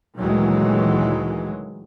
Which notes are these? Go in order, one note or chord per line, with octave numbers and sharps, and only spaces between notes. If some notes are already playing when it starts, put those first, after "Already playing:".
D2 A#2 D#3 E3 F#3 G#3